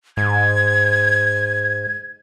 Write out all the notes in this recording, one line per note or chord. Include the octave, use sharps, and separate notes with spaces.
G#2 G#6